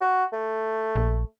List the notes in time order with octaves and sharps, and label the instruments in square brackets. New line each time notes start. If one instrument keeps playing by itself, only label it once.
[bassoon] F#4
A3
[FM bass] A#1